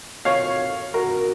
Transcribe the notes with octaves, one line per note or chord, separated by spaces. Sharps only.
C#5 F5
F#4 A#4